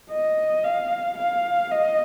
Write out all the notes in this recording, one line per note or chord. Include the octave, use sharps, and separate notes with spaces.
D#5
F5
F5
D#5